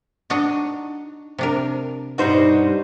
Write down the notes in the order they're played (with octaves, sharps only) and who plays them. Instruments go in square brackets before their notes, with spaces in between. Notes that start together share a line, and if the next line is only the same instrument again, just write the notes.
[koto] D4 F#4 D#5 [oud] D#4
[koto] C3 D4 A#4
[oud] G2 B2 G3 [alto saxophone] D#4 [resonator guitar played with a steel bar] F#4 C5